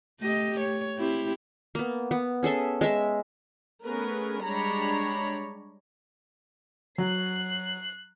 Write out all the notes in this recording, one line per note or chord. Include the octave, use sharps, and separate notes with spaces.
A3 G4 D#5
C#5
C4 E4 G4
A#3 B3
B3
C#4 G#4 A4 E5
G#3 E5
A3 B3 C#4 G#4 A#4 B4
G3 G#3 D4 C#5 A#5 B5
F#3 F#6 C7